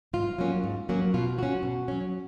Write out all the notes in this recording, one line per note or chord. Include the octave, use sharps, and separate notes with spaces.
G#2 F4
F#3 A#3 C#4
G#2
F#3 A#3 C#4
B2 F4
F#3 C#4 F#4
B2
F#3 C#4